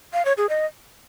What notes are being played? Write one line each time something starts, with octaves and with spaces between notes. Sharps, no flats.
F5
C#5
G#4
D#5